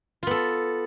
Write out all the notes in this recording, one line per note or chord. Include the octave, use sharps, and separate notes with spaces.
B3 F4 A4